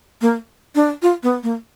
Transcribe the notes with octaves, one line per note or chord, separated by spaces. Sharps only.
A#3
D4
F4
B3
A#3